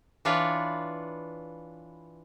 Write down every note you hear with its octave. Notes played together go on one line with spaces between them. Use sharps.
E3 D4 F4 B4 C#5 D5